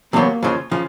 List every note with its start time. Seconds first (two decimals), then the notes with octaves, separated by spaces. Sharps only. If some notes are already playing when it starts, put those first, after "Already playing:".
0.13 E2 C3 D#3 F#3 A#3 B3
0.43 F2 C#3 F3
0.71 C#3 F3